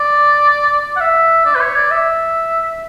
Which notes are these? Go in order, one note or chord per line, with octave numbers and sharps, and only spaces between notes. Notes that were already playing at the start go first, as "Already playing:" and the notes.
Already playing: D5
F#5
E5
D5
B4
C#5
D5
E5